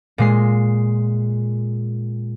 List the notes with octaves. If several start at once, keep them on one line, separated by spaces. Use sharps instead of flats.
A#2 G#3 C7